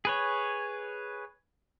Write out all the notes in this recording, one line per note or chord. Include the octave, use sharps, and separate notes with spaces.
G#4 B4 C#5